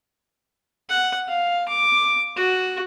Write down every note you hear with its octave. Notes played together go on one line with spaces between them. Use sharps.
F#5
F5
D6
F#4